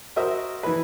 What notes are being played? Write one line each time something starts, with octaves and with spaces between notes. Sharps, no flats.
F#4 A#4 C5 D#5 E5
E3 B4